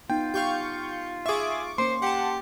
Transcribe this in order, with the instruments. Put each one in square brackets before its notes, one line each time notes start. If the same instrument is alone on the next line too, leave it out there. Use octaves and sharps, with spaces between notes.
[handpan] B3 D#4 [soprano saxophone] F4 [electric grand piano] G5
[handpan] G4 [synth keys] F5 C#6 G6
[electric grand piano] G#4 E5 [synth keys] C#6 D6
[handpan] A#3 C#4 [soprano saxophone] C5 [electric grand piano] C6
[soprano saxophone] G4 [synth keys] F#5 A5